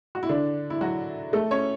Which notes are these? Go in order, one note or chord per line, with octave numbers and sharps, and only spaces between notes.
F#4
E4
D3 D4
E4
F#3 F#4
A3 A4
C#4 C#5